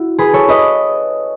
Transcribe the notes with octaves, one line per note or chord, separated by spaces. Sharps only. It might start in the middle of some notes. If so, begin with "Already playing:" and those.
Already playing: E4 F#4
G#4 B4
A4 C#5
B4 D#5